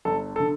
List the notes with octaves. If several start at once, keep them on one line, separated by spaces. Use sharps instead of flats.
G1 A4
D3 A4